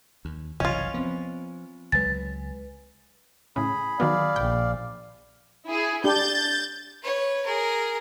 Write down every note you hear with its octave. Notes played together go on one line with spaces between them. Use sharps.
D#2
F#1 C2 E3 C#4 F4 D#5 G#6
F3 B3 C4
C#2 F#3 G#3 B4 G#5 A6
A2 C#3 G#4 B5
D#3 F#3 B3 D5 F5
A#1 G5
E4 G#4
D4 G4 G6 A6
B4 C#5
G#4 A#4